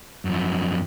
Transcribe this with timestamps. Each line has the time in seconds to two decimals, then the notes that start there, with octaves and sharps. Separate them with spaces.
0.25 F#2 F3